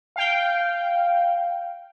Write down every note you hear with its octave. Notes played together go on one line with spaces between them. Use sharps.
F5 G5